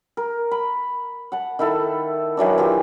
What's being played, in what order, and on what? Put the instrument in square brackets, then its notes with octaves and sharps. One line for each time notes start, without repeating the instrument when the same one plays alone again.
[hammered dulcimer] A#4
B5
F#5 A5
D#3 E4 A4
D#3 E3 F#3 D4
E3 F4 G4